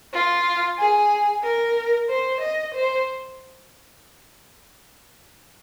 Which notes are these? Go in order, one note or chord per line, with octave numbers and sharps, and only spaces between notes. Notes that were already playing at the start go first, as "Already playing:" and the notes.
F4
G#4
A#4
C5
D#5
C5